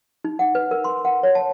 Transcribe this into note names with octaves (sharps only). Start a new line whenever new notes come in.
D#4
F#5
B4
A#4
C6
F#5
C#5
A5